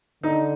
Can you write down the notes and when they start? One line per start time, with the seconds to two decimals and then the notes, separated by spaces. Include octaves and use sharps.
0.23 D3 D#4